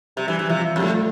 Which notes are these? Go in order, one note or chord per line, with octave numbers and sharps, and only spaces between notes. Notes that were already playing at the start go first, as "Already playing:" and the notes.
C3 G3
E3 G3
E3 G3
C3 F3
F2 G3
A3